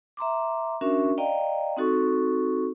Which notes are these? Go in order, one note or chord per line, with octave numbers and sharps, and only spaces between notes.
E5 A#5 C6 D6
C#4 D4 F#4 A#4 E5 C#6
D5 D#5 F5 G5 A#5
C4 D#4 F#4 A4 C#6